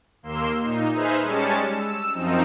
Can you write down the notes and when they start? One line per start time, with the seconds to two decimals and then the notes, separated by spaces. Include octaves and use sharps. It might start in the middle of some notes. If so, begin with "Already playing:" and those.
0.23 D#2 A#3 C6 E6
0.61 A#2 D#4
0.93 D#4 G#4 B4 C5 E5 F6
1.22 G3 G#3 C#4 A5 C#7
1.68 E6
2.14 F#2 F3 C4 D#4